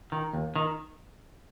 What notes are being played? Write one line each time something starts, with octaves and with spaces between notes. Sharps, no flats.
D#3
D#2
D#3